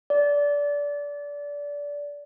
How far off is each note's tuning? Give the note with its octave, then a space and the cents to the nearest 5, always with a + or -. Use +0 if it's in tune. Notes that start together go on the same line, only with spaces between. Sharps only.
D5 -20